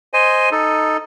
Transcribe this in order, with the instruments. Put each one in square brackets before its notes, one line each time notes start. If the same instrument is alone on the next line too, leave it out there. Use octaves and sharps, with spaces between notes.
[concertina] C5 D#5 G#5
D#4 A4